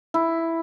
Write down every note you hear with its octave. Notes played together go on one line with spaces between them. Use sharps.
E4